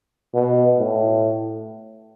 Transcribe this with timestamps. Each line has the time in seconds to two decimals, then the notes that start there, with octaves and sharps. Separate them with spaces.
0.34 B2
0.79 A2